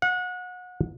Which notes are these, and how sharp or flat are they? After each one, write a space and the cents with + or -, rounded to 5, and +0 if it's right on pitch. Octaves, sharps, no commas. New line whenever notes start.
F#5 -30